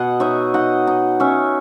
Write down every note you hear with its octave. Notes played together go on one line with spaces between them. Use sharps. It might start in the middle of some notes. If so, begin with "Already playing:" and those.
Already playing: B2 D#5 F#5
D#4 C#5 E5
D#4 D#5 F#5
D#4
C#4 C#5 E5